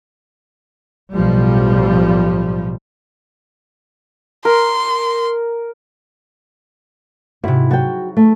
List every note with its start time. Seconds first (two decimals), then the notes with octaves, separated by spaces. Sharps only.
1.14 B1 A2 F3 G3
4.45 A#4 C6
7.43 G#2 C3 E4 F#4
7.71 F#3 F#4 G5 A6
8.17 A3